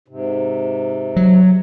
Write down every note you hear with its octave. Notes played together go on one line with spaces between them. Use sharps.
G#2 C3
F#3